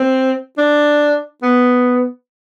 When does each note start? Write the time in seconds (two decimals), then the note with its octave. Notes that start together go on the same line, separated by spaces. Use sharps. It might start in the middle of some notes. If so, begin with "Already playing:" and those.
Already playing: C4
0.58 D4
1.42 B3